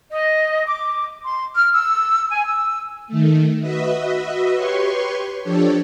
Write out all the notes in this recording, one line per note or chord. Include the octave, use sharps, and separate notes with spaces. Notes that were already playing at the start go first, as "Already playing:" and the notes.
D#5
D6
C6
F6
E6
G#5
E6
D#3 A3
F#4 B4 D#5 E5
G4 B4 C#5 C6 C#6
F3 D4 G4 A4 C#5